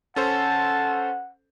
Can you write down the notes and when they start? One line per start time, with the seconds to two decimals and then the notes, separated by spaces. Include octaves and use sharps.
0.16 C#4 A4 C5 F#5 A5